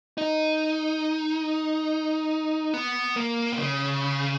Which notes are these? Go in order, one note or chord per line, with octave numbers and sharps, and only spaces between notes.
D#4
B3
A#3
B2
C#3